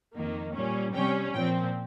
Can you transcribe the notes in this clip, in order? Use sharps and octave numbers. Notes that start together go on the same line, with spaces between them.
F2 D#3 A#3
A#2 G3 C#4
C3 G3 C#4 G5
A#2 F3 C4 G5